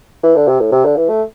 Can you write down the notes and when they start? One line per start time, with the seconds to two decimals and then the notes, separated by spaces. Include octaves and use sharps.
0.23 E3
0.36 D3
0.48 C3
0.60 A2
0.72 C3
0.85 D3
0.96 E3
1.09 A3